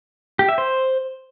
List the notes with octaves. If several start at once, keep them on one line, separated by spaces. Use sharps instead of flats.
G4
E5
C5